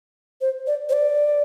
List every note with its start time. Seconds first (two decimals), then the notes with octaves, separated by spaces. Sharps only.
0.41 C5
0.67 D5
0.89 C5
0.93 D5